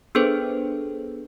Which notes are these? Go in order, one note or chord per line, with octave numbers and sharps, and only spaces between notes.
B3 D4 G#4 A4 B4 C5